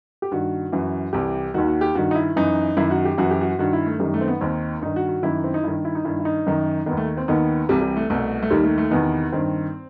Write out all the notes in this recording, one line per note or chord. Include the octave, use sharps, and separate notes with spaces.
G4
G2 D#3 F#4
F#2 E3 F#4
C2 C3 E3 G4
D#2 D#3 F#4
F#4
G4
G2 D#3 F#4
D#4
E4
F#2 E3 D#4
F#2 D#3 E4
F#4
G4
F#2 E3 F#4
G4
F#4
G2 D#3 F#4
E4
A3
F#2 D#3 G3
A3
C4
B3
D#2 D#3 C4
G2 D#3 D#4
F#4
F#4
F#2 D#3 E4
C4
D#4
G2 D#3 E4
E4
D#4
G2 D#3 E4
E4
D#4
F#2 D#3
D#3 B3
D#2
A3
C4
D#2 D#3 B3
C2 C3 E3 G3
G3
A3
C2 B2 A3
A3
D#2 D#3 G3
A3
A3
E2 C3 D#3 B3
G2 D#3 C4